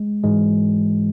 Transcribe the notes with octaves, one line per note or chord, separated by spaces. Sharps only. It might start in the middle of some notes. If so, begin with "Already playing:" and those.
Already playing: G#3
G#2 E3 G#3